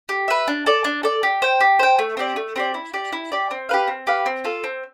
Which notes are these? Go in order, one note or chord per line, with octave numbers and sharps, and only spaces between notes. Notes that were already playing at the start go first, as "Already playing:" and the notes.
G4
B4 E5
D4
A4 D5
D4
A4 D5
G4
C5 G5
G4
C5 G5
A3
C4 G4 D5
A3
C4 G4 D5
E4
G4 D5
E4
G4 D5
C4
G4 B4 F5
C4
G4 B4 F5
C4
F4 A4
C4